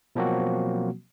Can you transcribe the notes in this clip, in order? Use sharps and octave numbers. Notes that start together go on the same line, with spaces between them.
B2 F3 F#3 A#3 C4 F#4